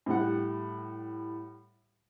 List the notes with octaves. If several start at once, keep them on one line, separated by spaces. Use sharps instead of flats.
A2 G3 F#5